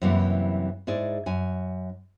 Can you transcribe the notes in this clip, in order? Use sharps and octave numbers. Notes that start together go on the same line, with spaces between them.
F#2 C3 E3 G3 A#3 E4
G#2 E4 G#4 D5
F#2 G#5